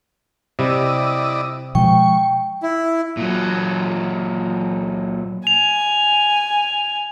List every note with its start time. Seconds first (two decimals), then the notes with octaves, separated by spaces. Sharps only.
0.59 C3 G3 E4 D5 D#5
1.75 B2 F3 G#3 G5 C#6
2.63 E4
3.17 A#2 F#3
5.47 G#5 F7